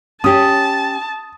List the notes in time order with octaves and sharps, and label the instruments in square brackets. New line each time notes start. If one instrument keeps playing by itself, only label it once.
[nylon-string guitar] C#4 G4 [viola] A5 [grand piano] D#6